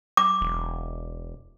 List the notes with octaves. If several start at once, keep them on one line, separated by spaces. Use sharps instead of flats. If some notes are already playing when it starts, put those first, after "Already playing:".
D6
E1